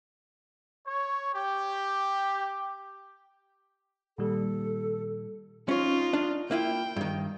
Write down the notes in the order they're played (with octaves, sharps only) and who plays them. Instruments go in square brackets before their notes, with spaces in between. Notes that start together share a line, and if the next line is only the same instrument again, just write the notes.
[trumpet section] C#5
G4
[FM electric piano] A#2 D#3 G3 [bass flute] A4
[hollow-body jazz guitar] C#4 C#5 [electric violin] D#4 F4
[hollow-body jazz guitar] D4
[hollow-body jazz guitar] A#3 E4 F4 [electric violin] G5
[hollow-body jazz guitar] G2 D#3